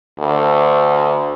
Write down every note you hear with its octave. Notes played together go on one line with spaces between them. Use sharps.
D2